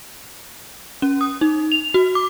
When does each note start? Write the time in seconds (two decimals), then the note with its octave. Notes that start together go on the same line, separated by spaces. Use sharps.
1.02 C#4
1.21 D#6
1.41 D#4
1.72 F7
1.94 F#4
2.15 D6